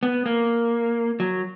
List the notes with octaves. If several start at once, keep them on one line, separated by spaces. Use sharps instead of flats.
B3
A#3
F#3